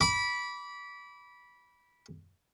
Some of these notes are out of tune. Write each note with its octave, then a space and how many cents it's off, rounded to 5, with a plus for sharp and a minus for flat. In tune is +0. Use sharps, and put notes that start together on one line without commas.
B5 -15 D6 -30